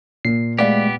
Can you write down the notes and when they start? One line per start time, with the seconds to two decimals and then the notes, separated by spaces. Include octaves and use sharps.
0.25 A#2 C7
0.58 G#3 A3 B3 G4 D5 F5